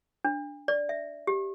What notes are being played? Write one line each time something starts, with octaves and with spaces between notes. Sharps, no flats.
D4
D5
E5
G4